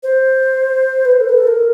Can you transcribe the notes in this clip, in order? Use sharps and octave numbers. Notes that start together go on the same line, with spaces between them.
C5
B4
C5
A4
B4
A4
A#4